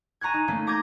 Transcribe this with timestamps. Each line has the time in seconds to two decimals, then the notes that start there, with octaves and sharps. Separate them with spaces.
0.21 G#5 A#5 C#6 F#6 G#6
0.34 D#4
0.48 A3 A#3 C#4
0.67 A#5 D6 G6 G#6 A#6